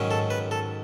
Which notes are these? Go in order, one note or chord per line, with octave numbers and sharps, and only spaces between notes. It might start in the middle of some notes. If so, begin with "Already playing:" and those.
Already playing: G#2 D#3 F#3 C#4
A4
B4
A4